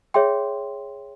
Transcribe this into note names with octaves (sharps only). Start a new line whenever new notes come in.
G#4 C#5 E5 G5 C6